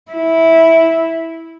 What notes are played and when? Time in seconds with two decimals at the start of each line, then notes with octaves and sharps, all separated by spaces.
0.12 E4